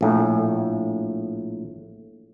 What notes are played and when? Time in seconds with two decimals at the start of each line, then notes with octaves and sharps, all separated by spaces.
0.01 A#1 A2